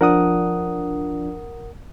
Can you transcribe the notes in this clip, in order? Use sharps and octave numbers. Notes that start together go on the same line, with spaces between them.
F3 D4 A#4 F#5 D#6